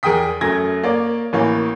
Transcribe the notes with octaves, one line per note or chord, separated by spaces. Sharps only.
E2 G#4 A#4 G5 D#6 B6
F#2 A3 G#6 A#6
A#3 C#5 D5
A1 E3 A#3 C#5